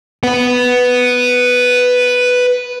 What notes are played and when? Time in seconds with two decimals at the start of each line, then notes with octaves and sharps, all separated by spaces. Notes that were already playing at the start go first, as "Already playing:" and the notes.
0.23 B4 F#5